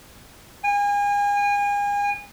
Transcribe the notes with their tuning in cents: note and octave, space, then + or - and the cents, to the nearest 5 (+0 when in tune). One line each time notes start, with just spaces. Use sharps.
G#5 -35